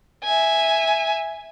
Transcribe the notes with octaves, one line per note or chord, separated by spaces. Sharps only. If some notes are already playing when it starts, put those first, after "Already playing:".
E5 G#5